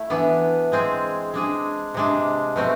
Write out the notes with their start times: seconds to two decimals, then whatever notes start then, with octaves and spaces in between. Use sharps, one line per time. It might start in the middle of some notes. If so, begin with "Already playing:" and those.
Already playing: A3 E4
0.10 E3 B3 D4
0.72 G#3 C4 G#4
1.34 G#3 D4 G#4
1.94 C3 G#3 D4
2.56 B2 A3 C4